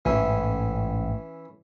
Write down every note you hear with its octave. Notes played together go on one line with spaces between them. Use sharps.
A1 G#2 E3 C#4 E4